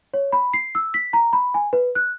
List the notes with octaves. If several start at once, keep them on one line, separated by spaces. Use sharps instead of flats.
C#5
B5
C7
E6
B6
A#5
B5
G#5
B4
F#6